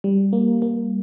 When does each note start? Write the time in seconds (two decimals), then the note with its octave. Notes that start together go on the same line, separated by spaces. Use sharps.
0.04 G3
0.33 A#3
0.62 A#3